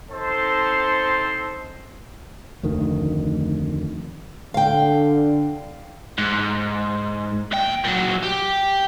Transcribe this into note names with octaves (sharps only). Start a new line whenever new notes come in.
C4 D#4 A4 C5 A5 C6
F1 D2 D#3
D3 F5 G5
G#2
D#2 G5
A#2 F#3
G4